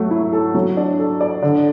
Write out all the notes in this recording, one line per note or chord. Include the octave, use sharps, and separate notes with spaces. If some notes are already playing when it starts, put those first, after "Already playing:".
Already playing: F#3 A3
E4
A4
F#3
D4
A4
D5
D3